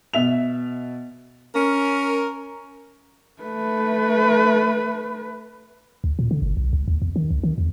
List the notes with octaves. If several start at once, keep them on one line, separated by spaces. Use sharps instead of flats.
B2 E5 F7
C#4 A#4
A3 B4
D2
A#2
D3
G1
B1
C#2
D#2
E2
D#3
C#2
D#3
E2